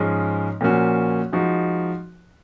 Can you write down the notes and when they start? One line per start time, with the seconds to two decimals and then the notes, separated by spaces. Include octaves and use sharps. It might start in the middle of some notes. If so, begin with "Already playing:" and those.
Already playing: G#2 F3 G#3 C#4 G#4
0.61 A#2 F3 A#3 C#4 F#4
1.32 F3 G#3 D#4 F#4